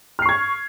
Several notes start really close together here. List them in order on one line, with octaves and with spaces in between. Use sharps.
F6 C7 C#6 G#6